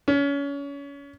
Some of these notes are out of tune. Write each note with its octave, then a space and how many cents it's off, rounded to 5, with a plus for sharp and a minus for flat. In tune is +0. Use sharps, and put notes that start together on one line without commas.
C#4 +30